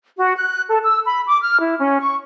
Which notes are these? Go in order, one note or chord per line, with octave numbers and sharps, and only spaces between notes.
F#4
F#6
A4
E6
B5
D6
F6
E4
C#4
C#6